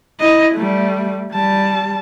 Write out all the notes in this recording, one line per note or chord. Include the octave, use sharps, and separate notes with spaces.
E4 D#5
G3 A3
G3 A5